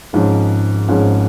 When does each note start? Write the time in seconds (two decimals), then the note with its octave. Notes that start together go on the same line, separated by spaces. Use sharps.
0.13 G#1 G#2 F3 C#4
0.89 G#1 G#2 F3 C#4